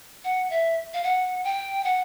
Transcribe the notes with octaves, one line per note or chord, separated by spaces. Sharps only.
F#5
E5
F5
F#5
G5
F#5